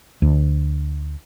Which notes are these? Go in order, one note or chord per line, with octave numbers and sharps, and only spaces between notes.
D2